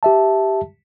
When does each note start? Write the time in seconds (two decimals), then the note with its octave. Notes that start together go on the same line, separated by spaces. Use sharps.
0.03 G4 E5 A5